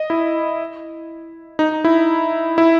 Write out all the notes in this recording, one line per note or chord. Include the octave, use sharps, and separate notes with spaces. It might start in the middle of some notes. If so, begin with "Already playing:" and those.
Already playing: D#5
E4
D#4
E4
E4